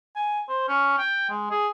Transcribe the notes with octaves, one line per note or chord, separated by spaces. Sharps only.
G#5
C5
C#4
G5
G#3
G#4